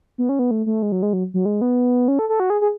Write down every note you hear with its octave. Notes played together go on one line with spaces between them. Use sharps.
B3
C#4
B3
A3
A3
G#3
F#3
G#3
F#3
F#3
G#3
B3
C#4
A4
A4
F#4
G#4
G#4